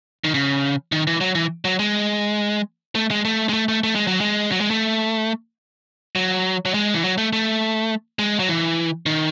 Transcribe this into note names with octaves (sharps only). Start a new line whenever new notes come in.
D#3
C#3
D#3
E3
F#3
E3
F#3
G#3
A3
G#3
A3
G#3
A3
A3
A3
G#3
F#3
G#3
F#3
G#3
A3
F#3
F#3
G#3
E3
F#3
A3
A3
G#3
F#3
E3
D#3